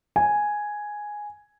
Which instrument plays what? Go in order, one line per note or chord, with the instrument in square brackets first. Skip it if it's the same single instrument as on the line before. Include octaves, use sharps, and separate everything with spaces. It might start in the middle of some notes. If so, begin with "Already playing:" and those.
[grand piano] G#5